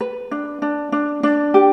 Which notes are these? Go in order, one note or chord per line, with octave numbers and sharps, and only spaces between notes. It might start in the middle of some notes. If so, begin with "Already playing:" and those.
B4
D4
D4
D4
D4
G4